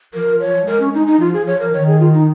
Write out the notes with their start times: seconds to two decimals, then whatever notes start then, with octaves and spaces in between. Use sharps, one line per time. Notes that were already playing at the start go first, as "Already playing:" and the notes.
0.14 F3 A#4
0.40 C#5
0.67 G#3 A#4
0.80 C#4
0.94 D#4
1.07 D#4
1.20 F3 F4
1.33 G#4
1.47 C#5
1.60 A#4
1.73 D#3 C#5
1.87 G#4
2.00 F4
2.14 D#4